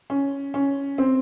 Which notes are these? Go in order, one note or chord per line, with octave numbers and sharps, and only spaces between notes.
C#4
C#4
C4